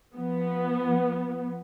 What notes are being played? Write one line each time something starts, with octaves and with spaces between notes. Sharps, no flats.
F3 B3